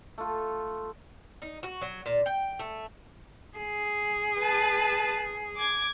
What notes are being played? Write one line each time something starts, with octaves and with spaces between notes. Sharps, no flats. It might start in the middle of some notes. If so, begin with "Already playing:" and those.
A3 F4
D#4
F#4
F#3
A#2
G5
A3
G#4
B4 A5
D6 G#6